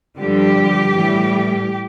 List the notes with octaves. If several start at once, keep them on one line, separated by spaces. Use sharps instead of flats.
G2 D3 F3 G3 G4
A2 E3 G3